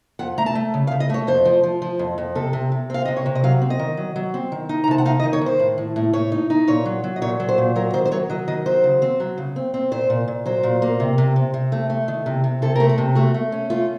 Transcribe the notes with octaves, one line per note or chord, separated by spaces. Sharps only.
F2 F#5
A3 A#5
A5
A3
C#3
F5
C#3
D#5
A3 C#5
F2 C5
F3
F3
F3
F2
F2
C3 A4
C3
C3
C4 F5
C3 D#5
C#5
C3
D#5
F#3 F5
C4
D#5
D#3
F#3
F#3
C4
D#3
D#4
A#5
C3 A5
F#5
D#4 F5
D#5
D#3
C#5
D#3 C5
A2
A2
A2
A2 C#5
D#4
D#4
A#2 C#5
F#3
F#3
D#5
A#2 C#5
F#3
C5
A#2
F#3 A#4
D#3 C5
C5
F#3 C#5
F#3 D#5
D#3 D#5
F#3 C5
C#3
C4
F#3
C#3
C4
C4
A#2 C5
A#2
A#2
F#3 C5
A#2
A#3
C3
C3
C3
C3
A3
A3
D#3
C3
C3
C3 A4
A3 A#4
A4
C3
A3 F#4
A3
C#4
A3 F4